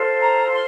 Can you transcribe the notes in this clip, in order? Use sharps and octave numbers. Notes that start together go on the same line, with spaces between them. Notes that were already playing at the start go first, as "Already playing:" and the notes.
Already playing: F4 A4 C5
A#5
C6